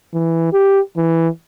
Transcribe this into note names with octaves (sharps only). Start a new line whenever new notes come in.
E3
G4
E3